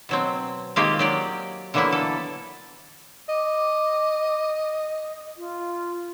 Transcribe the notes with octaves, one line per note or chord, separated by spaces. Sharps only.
B2 F#3 C4
D#3 G#3 A#3 C4 F4 G4
F#3 G4 D5
D3 E3 F#3 A#3 B3 E4
A4
D#5 D6
F4